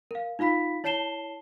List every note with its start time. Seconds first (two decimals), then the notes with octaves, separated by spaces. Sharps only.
0.11 A#4 F5
0.39 D#4 F4 F5 B5 B6
0.84 E4 C#5 A5 C7 E7 G7